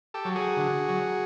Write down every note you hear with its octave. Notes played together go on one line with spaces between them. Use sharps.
G4 A4
F#3
F#4 G#4
D3
F#3